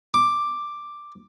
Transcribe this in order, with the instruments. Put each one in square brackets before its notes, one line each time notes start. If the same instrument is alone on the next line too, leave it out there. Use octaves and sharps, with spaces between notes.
[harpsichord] D6